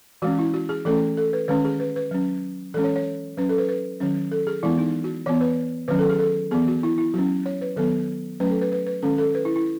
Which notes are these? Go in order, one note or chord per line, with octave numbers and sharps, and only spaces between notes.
E3 G#3 C#4 F#4
E4
F#4
G#4
E3 A3 C#4 A4
A4
B4
D#3 G#3 C#4 B4
G#4
B4
B4
F#3 C#4
E3 G#3 C#4 A4
C#5
C#5
F#3 C#4 B4
A4
B4
B4
D#3 F#3 C#4
A4
G#4
E3 G#3 B3 E4
D#4
F#4
E3 B3 C#5
B4
D#3 F#3 C#4 B4
A4
G#4
A4
E3 B3 G#4
F#4
E4
E4
F#3 C#4 F#4
C#5
B4
D#3 F#3 B3 A4
F#3 A3 C#4 B4
A4
B4
B4
B4
D#3 G#3 C#4 A4
A4
B4
E4
E4